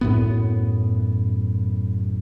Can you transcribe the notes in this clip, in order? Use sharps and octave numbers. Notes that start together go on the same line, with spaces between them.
F#2 A2 B3